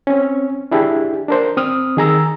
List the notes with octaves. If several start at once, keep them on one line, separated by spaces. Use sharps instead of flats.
C4 C#4
D4 E4 G4 G#4
D4 A#4 C5
C4 D#6 F6
D#3 G#4 A#5 E6